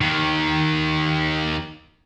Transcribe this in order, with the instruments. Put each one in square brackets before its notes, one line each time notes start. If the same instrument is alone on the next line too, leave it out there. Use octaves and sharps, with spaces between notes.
[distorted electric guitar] D#2 D#3